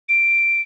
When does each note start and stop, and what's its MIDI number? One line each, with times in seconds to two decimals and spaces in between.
0.09 0.61 98